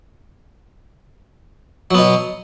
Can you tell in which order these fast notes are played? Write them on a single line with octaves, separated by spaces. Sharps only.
F#3 B3 B2